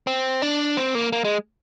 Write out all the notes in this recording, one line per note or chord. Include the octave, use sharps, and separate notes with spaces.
C4
D4
C4
A#3
A#3
G#3